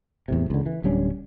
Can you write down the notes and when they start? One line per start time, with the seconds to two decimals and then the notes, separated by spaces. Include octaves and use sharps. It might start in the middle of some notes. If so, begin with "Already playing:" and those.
0.28 E2 A2 C3
0.50 C#2 D3
0.66 E3
0.84 D1 G3 C#4 D4